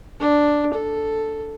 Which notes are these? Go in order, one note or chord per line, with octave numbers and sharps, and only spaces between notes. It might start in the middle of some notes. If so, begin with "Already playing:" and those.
D4
A4